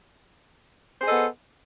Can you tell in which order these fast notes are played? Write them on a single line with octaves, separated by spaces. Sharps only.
C5 G#4 A4 D#5 B3